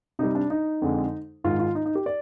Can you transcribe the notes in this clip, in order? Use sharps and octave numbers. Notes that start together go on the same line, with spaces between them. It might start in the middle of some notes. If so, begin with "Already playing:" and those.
C3 G3 D#4
D4
D#4
F2 D3 G#3
G#2 D#3 G#3 F4
F4
D#4
D#4
G4
D5